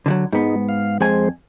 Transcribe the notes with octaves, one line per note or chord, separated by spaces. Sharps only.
D3 E3 F#3
G#2 G#3 B3 D#4
F5
F2 G#3 C5 G#5